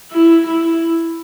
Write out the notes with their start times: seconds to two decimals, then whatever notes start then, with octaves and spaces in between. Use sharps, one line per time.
0.12 E4
0.47 E4